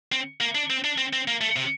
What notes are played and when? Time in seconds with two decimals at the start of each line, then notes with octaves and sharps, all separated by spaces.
0.12 C4
0.41 A#3
0.55 D4
0.70 C4
0.84 D4
0.98 C4
1.13 C4
1.28 A#3
1.41 A3
1.56 C3